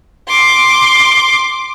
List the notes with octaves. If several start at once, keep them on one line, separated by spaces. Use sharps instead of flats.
C6 D6